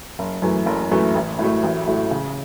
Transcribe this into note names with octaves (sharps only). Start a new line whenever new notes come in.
F#1
F#2 E3 A3
F#1
F#2 E3 A3
A1
A2 F#3 A3
A1
A2 F#3 A3
C#3